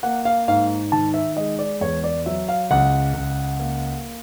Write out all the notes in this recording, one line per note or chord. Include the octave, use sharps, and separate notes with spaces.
A#3 F#5
F5
G#2 F5
D#3 A5
E5
G#3 D#5
D5
E2 C#5
D5
F#3 E5
F5
C#2 F#5
C#2
A#3